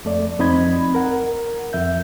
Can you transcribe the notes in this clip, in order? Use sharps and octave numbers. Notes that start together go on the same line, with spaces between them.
F2 A3 D5
F2 C4 D#4 D#5 B5 G#6
A#4 F#5
F2 E5 G6